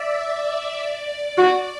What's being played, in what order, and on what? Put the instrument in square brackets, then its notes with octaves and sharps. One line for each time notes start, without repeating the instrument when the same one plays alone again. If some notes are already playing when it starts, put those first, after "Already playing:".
Already playing: [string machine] D5 E5
D5
D5
[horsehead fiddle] F#4